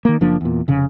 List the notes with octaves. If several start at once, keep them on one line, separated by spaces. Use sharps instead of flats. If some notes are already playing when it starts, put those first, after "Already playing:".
D#3 A#3
F#1 F3 A#3 D4
E2 A#2
F1 C#3